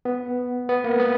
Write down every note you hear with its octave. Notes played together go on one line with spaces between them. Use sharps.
B3
B3
A#3
B3